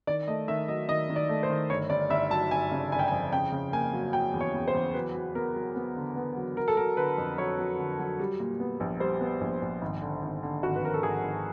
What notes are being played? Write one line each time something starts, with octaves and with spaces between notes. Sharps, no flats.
D#3 D5
A3 D#5
D#3 E5
F#3 D#5
D#3 D#5
D#3
D5
A3
C5
D#3
G1 C#5
G1 D5
G1 E5
F#3 A5
G1 G#5
C#3
G1 G#5
G5
G#5
F2
C#3 G5
C#3
A#3 G#5
F#3
F#3 G5
E2
C#5
E2
C5
E2
F#3 B4
F#3
B3 A#4
F#3
B3
D3
B3
F#3
F#3 A#4
A4
F#3 A#4
D3 B4
F2
F#3 C#5
F#3
D3
F#3
G3
A#2
B3
A#1
G3 C5
B3
A#1
A#1
G#1
D3
G#1
D3
G#1 F#4
B4
G#1 A#4
A4
G#1 G#4
G#1